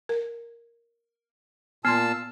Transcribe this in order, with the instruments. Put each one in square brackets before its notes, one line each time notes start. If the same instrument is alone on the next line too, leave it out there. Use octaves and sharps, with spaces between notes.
[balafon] A#4
[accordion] A#2 A5 E6 [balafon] B3 C6 [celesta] F6 C7